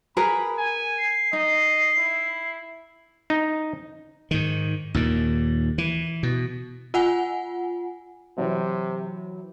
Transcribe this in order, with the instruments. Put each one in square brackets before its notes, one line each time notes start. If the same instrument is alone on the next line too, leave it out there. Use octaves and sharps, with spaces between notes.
[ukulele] G#4 A#4 B4 [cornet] B5
[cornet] G#5
[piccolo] C7
[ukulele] D#4 [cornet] D#5
[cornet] E4
[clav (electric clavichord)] D#4
[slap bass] G#2 D#3
D#2 A#2 D#3
E3
B2
[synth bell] F4 F#5 G#5
[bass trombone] C3 [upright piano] E3 F#3